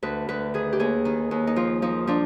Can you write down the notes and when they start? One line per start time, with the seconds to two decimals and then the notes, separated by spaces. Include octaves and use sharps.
0.03 D2 B4
0.29 D2 B4
0.54 D#3 G#4
0.73 G4
0.80 D#2 G#4
1.05 D#3
1.31 D#2
1.47 D#4
1.56 F3 F4
1.82 F3 D#4
2.07 F3 D4